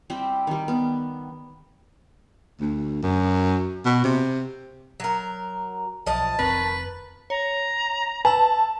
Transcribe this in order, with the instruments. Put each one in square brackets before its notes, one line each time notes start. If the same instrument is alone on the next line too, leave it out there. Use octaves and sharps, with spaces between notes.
[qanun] G3 C4 E4 G4
D#3 G3
B3
[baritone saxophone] D2
F#2
B2
C3
[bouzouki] F#3 A#4
[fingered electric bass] B1 [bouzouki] F3 D#5 [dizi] A5
[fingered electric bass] F1 C4 [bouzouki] D#3 [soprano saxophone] B4
[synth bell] C#5 [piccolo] A#5
[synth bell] B4 A#5 E6 [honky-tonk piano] A5